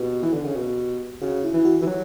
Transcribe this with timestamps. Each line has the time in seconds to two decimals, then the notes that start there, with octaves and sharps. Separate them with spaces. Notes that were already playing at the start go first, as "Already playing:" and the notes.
Already playing: B2 G4
0.23 E3
0.33 D3
0.45 C#3
0.56 B2
1.22 C#3 F#4
1.44 E4
1.53 E3
1.65 F#4
1.81 E3 G4
1.86 F#3 F#4